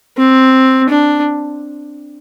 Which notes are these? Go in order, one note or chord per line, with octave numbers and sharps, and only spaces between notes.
C4
D4